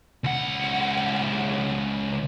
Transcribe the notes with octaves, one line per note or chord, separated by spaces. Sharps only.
C#2 F#5